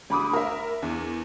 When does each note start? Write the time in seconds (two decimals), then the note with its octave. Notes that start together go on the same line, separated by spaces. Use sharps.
0.10 D2 B5 D6 D#6
0.33 A#4 E5
0.82 E2